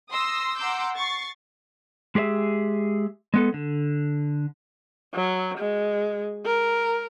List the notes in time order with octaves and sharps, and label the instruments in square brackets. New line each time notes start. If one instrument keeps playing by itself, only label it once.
[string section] C6 D#6 E6 A#6
F#5 A#5 C6 D6 E6 G6
C#6 A6 C7
[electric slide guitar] G#3 G4 G#4 D5 E5
G#3 B3 A4
D3
[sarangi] F#3
G#3
A#4